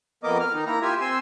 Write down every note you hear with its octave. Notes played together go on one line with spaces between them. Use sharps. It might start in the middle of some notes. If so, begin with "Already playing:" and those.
F2 A#3 B3 A#4 D#5 D6
F6
D#3 D#4
A#3 E4 A#5
F4 G4 E5 G#5
C4 G#5 C6 E6